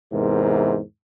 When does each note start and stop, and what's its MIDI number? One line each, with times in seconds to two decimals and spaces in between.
0.12 0.80 40
0.12 0.80 44
0.12 0.80 48
0.12 0.80 70